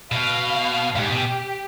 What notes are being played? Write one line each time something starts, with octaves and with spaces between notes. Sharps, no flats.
B2 F5
G#2 G4
B2